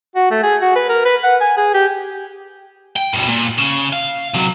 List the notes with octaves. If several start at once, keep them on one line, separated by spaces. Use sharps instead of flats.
F#4
A3
G#4
F#4
B4
A#4
B4
F#5
G#5
G#4
G4
G5
G2 B2
A#2
C#3
F5
C3 F#3